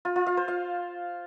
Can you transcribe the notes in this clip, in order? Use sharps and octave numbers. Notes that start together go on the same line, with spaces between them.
F4
F4
F5
C5
F5